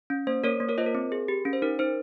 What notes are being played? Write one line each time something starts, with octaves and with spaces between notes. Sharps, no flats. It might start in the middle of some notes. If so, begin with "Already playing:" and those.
C#4
A#3 C5
A#3 A#4 C#5
A#3
A#4 C#5
F4 C5 D#5
A#4
C4
G#4
G4
C#4
C5
D#4 A#4
D#4 C5